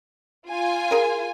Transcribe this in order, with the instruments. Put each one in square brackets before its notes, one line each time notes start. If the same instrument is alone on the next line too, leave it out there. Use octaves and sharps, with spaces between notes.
[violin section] F4 G#5
[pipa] G#4 A#4